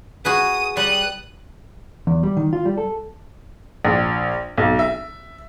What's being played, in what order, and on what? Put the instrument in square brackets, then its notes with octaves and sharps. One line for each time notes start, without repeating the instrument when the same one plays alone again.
[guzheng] F#4 G#4 B4 [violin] D#6
[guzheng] G3 [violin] D#6 F#6
[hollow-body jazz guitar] E2
G3
D#3
F4
G3
A4
[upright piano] A#1
B1
E5